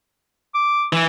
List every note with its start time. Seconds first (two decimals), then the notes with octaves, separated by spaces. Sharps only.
0.55 D6
0.93 E3